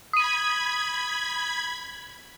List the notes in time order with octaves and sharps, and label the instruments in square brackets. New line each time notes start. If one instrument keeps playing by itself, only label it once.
[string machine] B5 G#6 [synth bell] D#6 D#7